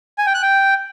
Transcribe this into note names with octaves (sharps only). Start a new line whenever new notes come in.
G#5
G5
F#6
G5